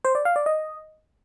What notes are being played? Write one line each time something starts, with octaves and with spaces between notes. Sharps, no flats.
C5
D5
F5
D5
D#5